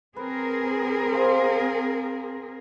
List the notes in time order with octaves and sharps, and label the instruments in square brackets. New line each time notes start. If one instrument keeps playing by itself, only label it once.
[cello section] C4 G#4 A#4 [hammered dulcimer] B4
[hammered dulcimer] C5 F5